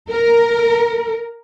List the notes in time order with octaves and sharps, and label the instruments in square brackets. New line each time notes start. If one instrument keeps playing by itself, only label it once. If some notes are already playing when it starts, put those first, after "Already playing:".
[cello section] A#4